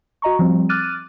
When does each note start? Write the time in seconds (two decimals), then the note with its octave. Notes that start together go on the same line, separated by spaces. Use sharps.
0.22 F#4 D#5 A#5 C#6
0.39 F3 G3 C4
0.69 D6 F6 F#6 A6 D#7